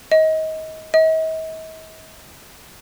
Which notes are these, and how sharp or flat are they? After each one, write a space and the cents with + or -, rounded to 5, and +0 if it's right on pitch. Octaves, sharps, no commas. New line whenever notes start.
D#5 +25
D#5 +45